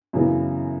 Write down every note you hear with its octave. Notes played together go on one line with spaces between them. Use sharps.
F#2 C#3 E3 B3